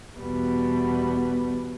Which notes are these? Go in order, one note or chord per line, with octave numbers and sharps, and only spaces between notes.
E2 B2 G3 B3